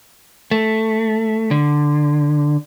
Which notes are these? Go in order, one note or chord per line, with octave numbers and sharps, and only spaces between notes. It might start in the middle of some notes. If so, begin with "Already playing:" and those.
A3
D3